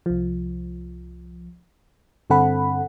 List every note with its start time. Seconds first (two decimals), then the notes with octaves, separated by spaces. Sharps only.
0.06 C2 F3
2.30 G2 D3 C4 A4 F#5 B5